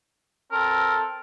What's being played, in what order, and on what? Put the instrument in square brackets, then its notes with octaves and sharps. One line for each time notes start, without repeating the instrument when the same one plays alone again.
[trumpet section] C4 A4 [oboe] A#4